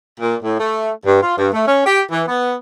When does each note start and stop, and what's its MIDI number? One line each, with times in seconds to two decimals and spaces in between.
0.20 0.35 46
0.42 0.57 45
0.59 0.89 57
1.05 1.20 43
1.21 1.35 65
1.37 1.47 43
1.52 1.65 57
1.67 1.82 61
1.85 2.02 67
2.11 2.23 52
2.27 2.53 59